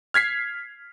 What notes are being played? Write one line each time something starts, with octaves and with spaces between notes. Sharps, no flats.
F6 G#6 B6 C7